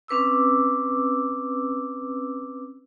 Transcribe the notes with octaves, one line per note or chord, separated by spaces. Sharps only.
C4 C#4 B4 D6 E6